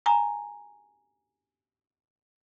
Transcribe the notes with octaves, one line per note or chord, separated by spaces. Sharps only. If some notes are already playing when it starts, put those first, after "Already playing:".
G#5 A#5